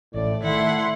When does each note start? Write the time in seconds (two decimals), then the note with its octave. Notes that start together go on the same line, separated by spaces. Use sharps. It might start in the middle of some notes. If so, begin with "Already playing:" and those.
0.14 A1 A2 D5
0.44 D#3 A3 E4 F#5 C6